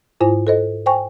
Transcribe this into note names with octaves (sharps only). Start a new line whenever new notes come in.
G#2 E4 F4 C5 G#5
A4 C5 D#5
C5 G5 G#5 C#6